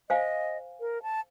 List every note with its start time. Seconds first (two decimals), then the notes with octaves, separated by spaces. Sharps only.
0.10 C5 D#5 F5 G#5
0.80 A#4
1.03 A5